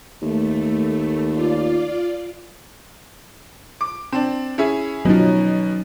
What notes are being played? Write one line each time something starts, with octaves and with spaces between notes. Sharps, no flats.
D#2 A3
F4 D5
D6
C4 D4
C#4 E4 G#4
B2 F3 F#3 C#4 D#4